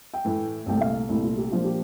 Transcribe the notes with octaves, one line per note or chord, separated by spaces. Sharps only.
G5
A2 E3 A3
C2 A#2 A3 G5
F5
C2 A#2 A3 E4
F4
G4
A#2 F3 A#3 D4 F4
G4